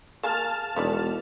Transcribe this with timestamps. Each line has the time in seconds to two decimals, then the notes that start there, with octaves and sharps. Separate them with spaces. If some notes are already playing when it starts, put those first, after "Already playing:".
0.23 A#3 G#4 A#4 A5 F6
0.76 E1 D#4 B4 D5